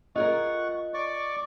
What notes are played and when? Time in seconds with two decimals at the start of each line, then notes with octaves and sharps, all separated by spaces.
0.16 F4 G#4 A#4 D#5 F#5 C#6
0.94 D5 C#6 D6